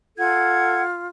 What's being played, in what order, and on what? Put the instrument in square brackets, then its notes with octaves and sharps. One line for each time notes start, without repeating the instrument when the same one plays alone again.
[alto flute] F4 [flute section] A4 F#5 G#6